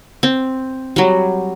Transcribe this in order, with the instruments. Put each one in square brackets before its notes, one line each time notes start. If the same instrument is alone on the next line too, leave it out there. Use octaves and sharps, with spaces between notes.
[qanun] C4
F#3 G3